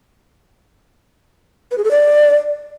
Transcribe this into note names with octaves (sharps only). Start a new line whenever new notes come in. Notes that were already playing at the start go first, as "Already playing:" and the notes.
B4
G#4
A4
D5